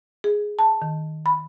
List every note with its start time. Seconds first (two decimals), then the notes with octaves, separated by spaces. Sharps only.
0.24 G#4
0.59 A5
0.82 D#3
1.26 B5